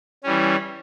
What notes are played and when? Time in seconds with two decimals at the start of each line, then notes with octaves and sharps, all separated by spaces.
0.24 E3 G3 C#4